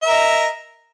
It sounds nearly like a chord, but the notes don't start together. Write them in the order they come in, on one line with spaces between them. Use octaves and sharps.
E5 A#4 D#5